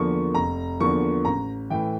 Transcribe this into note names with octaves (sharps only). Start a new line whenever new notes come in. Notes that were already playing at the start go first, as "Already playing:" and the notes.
Already playing: E2 D3 F3 A#3 C#6
F1 A#5
E2 D3 F3 A#3 C#6
A1 A#5
A2 E3 G5